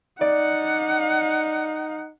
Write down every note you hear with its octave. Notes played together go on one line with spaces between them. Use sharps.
D#4 D5 F#5